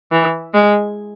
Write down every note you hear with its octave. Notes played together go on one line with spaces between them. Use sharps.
E3
G#3